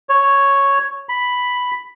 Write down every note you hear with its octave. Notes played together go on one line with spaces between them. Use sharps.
C#5
B5